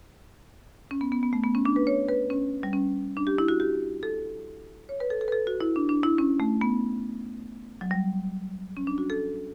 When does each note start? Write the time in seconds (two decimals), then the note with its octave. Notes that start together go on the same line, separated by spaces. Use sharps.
0.91 C#4
1.01 B3
1.12 B3
1.23 B3
1.33 A3
1.44 B3
1.55 C#4
1.65 D4
1.76 B4
1.87 C#5
2.08 B4
2.30 C#4
2.63 G3
2.73 C#4
3.17 D4
3.27 G4
3.38 E4
3.48 F#4
3.60 G4
4.03 A4
4.89 C#5
5.00 B4
5.10 A4
5.21 A4
5.28 B4
5.32 A4
5.47 F#4
5.61 E4
5.76 D4
5.89 D4
6.03 E4
6.18 C#4
6.40 A3
6.61 B3
7.81 F#3
7.91 G3
8.77 C#4
8.87 D4
8.98 F#4
9.10 A4